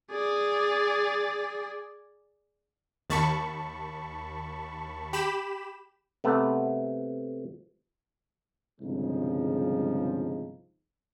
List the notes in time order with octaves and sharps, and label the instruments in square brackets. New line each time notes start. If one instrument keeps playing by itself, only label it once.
[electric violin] G#4 D5
[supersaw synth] D#2 A5 B5 C#6
G4 B5 E7
[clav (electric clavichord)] C3 A3 B3
[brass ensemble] G1 C2 C#3 F3 G#3 D#4